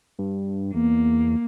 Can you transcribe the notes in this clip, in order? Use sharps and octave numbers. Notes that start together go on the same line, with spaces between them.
G2
E2 A#3